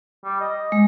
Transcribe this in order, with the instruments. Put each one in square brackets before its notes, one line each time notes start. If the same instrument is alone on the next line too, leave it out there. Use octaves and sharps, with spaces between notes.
[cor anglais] G3
D#5
[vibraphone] G#3